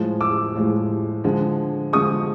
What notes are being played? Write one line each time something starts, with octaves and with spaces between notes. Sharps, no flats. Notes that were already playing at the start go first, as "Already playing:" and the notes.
Already playing: A2 F3 G#3
D6 E6
A2 F3 G#3
D3 F3 G#3
D3 F3 G#3 C#6 D#6